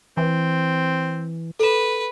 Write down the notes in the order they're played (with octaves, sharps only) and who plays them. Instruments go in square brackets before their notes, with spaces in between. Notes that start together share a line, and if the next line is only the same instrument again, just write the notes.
[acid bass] E3 [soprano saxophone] C4
[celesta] A4 E7 [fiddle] B4